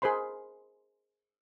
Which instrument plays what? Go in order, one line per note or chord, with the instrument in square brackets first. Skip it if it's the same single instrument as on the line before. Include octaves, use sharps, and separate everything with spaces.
[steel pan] G#4 A#4 C5 B5 C6